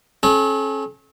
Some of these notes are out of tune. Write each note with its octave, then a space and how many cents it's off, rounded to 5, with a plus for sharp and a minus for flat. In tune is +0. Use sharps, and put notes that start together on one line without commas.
C#4 -35 A4 -35